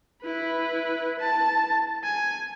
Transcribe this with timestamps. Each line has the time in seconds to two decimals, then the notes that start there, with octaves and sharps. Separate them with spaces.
0.23 E4 B4
1.19 A5
2.04 G#5